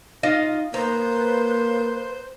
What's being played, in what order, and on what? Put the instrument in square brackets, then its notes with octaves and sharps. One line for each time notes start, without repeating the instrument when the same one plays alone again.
[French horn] D#4 [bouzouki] F4 D#5
[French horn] A#3 [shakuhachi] B4 [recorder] C5 [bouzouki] A#5